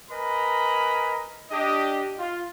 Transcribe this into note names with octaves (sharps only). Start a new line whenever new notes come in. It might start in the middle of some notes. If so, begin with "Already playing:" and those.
A#4 B4 D#5 G#5 A#5 B5
D4 G4 D#5
F4